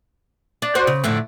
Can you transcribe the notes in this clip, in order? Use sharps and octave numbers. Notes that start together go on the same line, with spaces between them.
D4
F#4 C5 D5
C#3
F2 A2 D3